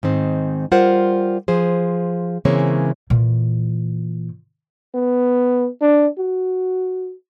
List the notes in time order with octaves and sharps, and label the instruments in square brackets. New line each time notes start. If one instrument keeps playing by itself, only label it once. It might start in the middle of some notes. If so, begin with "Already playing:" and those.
[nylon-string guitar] G#2 D#3 C4
G3 F4 A#4 C5 F#5
F3 G#4 C5
C#3 E3 G#3 A#3 C4 C#5
[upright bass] A#2 E3
[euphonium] B3
D4
F#4